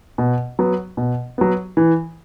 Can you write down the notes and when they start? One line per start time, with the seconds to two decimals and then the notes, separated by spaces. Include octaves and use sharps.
0.18 B2
0.59 F#3 B3
0.97 B2
1.38 F#3 B3
1.77 E3